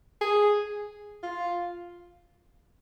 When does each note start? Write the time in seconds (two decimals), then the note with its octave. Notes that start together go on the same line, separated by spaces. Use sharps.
0.21 G#4
1.23 F4